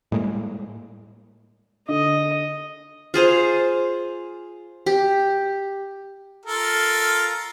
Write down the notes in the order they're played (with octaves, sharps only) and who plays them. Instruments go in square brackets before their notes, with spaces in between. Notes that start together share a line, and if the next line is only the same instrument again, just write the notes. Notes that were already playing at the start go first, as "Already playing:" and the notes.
[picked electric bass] A2 G3 G#3 A#3
[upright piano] D3 [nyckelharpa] D#5
[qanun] F4 G#4 C5 F5
G4
[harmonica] F4 A4 A#4